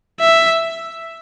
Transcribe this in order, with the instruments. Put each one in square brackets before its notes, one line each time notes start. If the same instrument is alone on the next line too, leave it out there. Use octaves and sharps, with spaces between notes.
[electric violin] E5